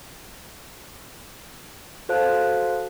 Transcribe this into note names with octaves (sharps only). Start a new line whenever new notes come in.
F#4 A4 C5 F5 A5 F#6